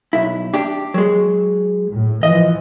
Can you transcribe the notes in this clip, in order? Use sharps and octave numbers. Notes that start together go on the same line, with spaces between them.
B1 E4
D4 G4
F#3 G#3
A2
E3 F3 D#5